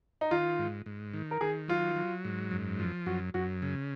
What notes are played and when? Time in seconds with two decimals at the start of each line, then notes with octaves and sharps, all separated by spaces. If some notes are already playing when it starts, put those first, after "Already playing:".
0.21 D#4
0.31 D#3 F4
0.59 G#2
0.86 G#2
1.14 D#3
1.31 A#4
1.41 D#3 G#4
1.68 F#3 F4
1.96 F#3
2.25 G#2
2.51 F#2
2.79 F3
3.06 F#2 F#4
3.34 F#2 F#4
3.62 C#3